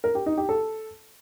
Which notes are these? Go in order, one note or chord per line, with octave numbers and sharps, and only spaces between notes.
A#4
G4
D#4
G4
A4